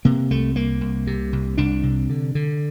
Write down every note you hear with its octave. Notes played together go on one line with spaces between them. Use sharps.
C3 A#3
C2 A3
C2 A#3
C2
C3
C2
C2 D4
C3
D3
D3